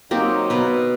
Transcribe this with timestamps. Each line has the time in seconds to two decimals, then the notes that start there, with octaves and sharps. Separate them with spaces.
0.11 F#3 A#3 C4 D#4 G4
0.50 B2 B4